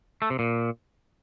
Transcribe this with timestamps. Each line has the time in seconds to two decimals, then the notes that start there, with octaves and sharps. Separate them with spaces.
0.22 A3
0.30 C3
0.39 A#2